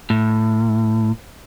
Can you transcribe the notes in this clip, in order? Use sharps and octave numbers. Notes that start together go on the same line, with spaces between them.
A2